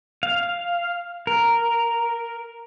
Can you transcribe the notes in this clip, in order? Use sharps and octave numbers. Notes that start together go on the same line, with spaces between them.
F5
A#4